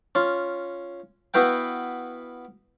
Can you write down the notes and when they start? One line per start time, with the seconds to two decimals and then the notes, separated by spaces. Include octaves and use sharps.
0.15 C#4 F4
1.34 B3 E4 F#4 B4 F5 G5